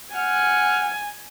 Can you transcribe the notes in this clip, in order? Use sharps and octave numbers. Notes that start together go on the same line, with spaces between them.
F#5 G#5 F6